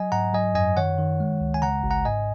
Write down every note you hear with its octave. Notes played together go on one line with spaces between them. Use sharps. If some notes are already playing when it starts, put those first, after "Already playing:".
Already playing: F#3 D#5 G#5
G#2 F#5 A#5
F#3 D#5 G#5
F#2 D#5 G#5
D#3 C#5 F#5
D#3
G#3
C#2
G#5
C#3 F#5 A#5
G#1
F#5 A#5
G#2 D#5 G#5